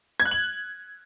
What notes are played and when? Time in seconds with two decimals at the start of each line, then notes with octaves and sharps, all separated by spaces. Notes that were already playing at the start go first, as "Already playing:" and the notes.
0.20 G#6
0.25 F#6
0.31 F#7